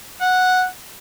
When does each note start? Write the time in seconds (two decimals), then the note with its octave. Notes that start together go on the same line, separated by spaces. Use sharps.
0.21 F#5